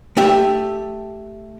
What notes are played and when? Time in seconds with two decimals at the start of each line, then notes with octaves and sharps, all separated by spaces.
0.17 A3 G4 E5